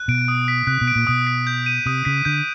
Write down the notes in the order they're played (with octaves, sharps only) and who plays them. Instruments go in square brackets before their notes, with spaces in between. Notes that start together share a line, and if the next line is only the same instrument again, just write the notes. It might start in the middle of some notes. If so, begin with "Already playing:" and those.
Already playing: [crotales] F#6
[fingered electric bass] B2 [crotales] D7
[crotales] D#6
B6
[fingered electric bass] C3 [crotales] F#6
[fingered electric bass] B2
[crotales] D7
[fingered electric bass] A#2
[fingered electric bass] B2 [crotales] D#6
[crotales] B6
G6
D#7
[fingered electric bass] C3 [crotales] D#6
[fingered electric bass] C#3 [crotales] B6
[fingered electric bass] D3 [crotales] G6